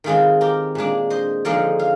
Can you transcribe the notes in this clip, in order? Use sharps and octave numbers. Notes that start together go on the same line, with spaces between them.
D#3 G#3 C4 F4 G#4
G4 A#4
A#2 G#3 D4
C5 D#5
D3 F3 G#3 D#4 D5 F5
F5